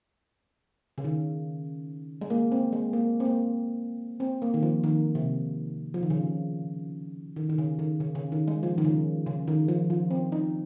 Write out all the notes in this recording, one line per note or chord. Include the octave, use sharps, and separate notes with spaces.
C#3
D#3
G#3
A#3
C4
G#3
A#3
C4
A#3
C4
A#3
D#3
F3
D#3
C3
F3
D#3
C#3
D#3
D#3
C#3
D#3
C#3
C#3
D#3
G#3
F3
D#3
C#3
C#3
D#3
F3
F3
C4
D#4